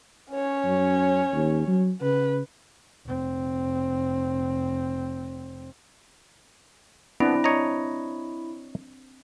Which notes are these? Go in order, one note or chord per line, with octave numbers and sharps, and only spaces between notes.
C#4 C#5
F#2
D#2
F#3
C#3 B4
F1 C4
B3 C4 D4 E4
C#5 D#5 A#5